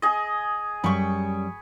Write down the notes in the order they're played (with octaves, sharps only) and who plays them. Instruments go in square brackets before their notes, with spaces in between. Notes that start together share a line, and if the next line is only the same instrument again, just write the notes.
[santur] G#4 D#5
[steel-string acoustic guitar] F#2 G3 [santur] B5 C#6